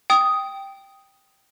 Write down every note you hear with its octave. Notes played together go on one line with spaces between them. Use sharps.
G5 D#6